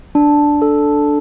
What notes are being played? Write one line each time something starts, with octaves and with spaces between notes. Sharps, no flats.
D4
A4